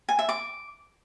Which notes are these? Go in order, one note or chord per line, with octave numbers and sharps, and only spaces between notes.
G#5
E5
D6